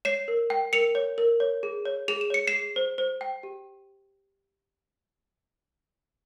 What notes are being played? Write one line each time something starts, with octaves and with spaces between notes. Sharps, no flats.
C#5 C7 E7
A#4
G5
A#4 C#7 F7
C#5
A#4
C#5
G#4
C#5
G#4 F7
E7
C#5 C#7
C7 E7
G#4
C5
C5
G5
G4